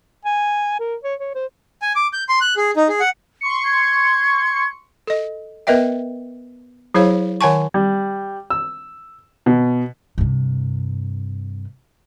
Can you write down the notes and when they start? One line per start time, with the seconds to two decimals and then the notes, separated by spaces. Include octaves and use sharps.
0.25 G#5
0.80 A#4
1.04 C#5
1.20 C#5
1.35 C5
1.82 G#5
1.96 D6
2.13 G6
2.29 C6
2.41 F#6
2.57 G#4
2.77 D#4
2.89 G#4
3.00 F#5
3.41 C6 C#6 C#7
3.65 G#6
5.07 A4 D#5
5.67 B3 A#4 B4 D#5 E5 G5
6.94 F#3 E4 G#4 C5 C#5 F5
7.41 D#3 C#5 F#5 G#5 A5 C#6
7.74 G3
8.50 E6
9.46 B2
10.18 G2 C3